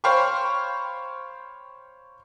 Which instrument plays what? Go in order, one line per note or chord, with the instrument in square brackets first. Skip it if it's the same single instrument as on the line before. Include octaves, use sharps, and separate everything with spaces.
[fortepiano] C5 C#5 F5 G5 B5 C#6